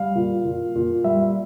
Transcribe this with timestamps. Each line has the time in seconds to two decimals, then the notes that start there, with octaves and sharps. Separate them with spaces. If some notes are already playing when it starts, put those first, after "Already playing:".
Already playing: G3 F5
0.15 A#2
0.45 A#2
0.75 A#2
1.04 G3 E5